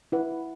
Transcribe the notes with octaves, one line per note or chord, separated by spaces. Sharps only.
E4 B4 F#5